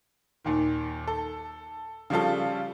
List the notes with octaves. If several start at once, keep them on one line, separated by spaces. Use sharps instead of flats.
D#2 A#2 D#3
A4
C#3 F3 G3 F4 A4